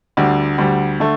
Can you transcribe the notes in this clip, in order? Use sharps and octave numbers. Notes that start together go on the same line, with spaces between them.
D2 D3 G3
D2 D3 G3
D3 A3